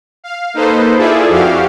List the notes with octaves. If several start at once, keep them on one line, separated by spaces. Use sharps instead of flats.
F5
A#3 D#4 A4 B4 C5
E4 F4 G#4 A4 D5 E5
F2 F#4 G4 F5